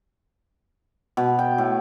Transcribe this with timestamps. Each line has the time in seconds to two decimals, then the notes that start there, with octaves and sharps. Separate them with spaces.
1.17 B2
1.39 G5
1.58 A2